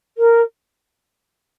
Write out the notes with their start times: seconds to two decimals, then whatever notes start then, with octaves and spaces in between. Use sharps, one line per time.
0.18 A#4